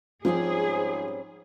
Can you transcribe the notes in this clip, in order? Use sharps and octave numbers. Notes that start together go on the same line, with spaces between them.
G#2 F3 G3 C4 C#4 G#4